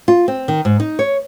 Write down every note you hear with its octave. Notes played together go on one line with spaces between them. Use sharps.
F4
C4
D#3
G#2
D#4
C#5